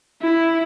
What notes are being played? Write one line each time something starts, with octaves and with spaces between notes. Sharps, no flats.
E4